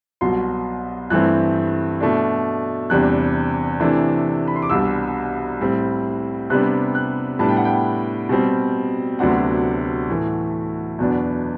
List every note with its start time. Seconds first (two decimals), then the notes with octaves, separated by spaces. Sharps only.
0.21 C2 B2 F#3 C6
1.10 G2 E3 A3 C4 F#6
2.00 B2 A3 D4
2.90 E2 C3 G3 D4 F#6
3.80 C3 E3 A3 D4
4.48 B5
4.56 C6
4.62 D6
4.70 C2 B2 G3 D4 E6
5.60 A2 G3 C4
6.50 C3 G3 B3 D4 F#6
6.95 F#6
7.39 A2 G3 B3 D4 A5
7.49 G5
7.57 F#5
7.65 G5
8.29 B2 G3 C4
9.19 D2 C3 F#3 B3 D4 F#5
10.09 A2 E3 A3
10.98 E2 B2 F#3 B3 D4